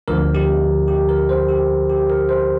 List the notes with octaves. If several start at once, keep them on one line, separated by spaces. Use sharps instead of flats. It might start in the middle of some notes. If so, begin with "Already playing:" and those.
D2 D3 F3 A#4
G4
G4
A#4
C5
G4
G4
A#4
C5